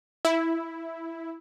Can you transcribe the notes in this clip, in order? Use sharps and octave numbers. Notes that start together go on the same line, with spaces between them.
E4